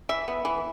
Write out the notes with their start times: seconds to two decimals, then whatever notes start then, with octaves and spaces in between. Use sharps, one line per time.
0.09 E3 E5
0.28 B3
0.45 E3